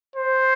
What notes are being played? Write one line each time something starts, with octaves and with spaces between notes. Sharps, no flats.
C5